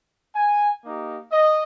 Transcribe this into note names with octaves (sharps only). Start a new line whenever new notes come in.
G#5
A#3 D#4 G4
D#5